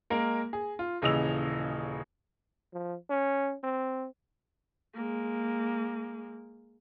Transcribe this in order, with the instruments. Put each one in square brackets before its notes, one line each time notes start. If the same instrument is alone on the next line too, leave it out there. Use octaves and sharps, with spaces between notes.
[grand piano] G#3 A#3 A#4
G#4
F4
D#1 C#3 E3 D#5 E6 F7
[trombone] F3
C#4
C4
[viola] G#3 A#3